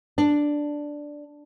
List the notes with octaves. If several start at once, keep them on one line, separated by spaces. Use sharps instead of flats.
D4